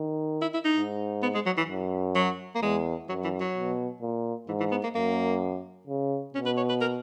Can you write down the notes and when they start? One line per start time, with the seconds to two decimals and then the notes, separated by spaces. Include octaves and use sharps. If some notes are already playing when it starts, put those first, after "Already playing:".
Already playing: D#3
0.42 E4
0.53 E4
0.65 D#4
0.76 G#2
1.22 B3
1.34 G#3
1.46 F#3
1.57 E3
1.69 F#2
2.15 F#3
2.55 A#3
2.62 E2 G#3
3.09 F#2 F#3
3.24 E3
3.40 F#3
3.55 B2
4.01 A#2
4.48 G#2 E3
4.60 E3
4.71 B3
4.83 A#3
4.94 F#2 A#3
5.87 C#3
6.34 B2 C#4
6.46 B4
6.57 C#5
6.69 B4
6.81 A#4